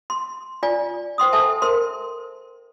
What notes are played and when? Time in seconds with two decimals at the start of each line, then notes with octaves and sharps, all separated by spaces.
0.10 C6
0.63 F4 D5 G#5
1.18 C5 G5 C6 D#6
1.33 A4 C5 E5 G#5 A5
1.62 A#4 C5 C6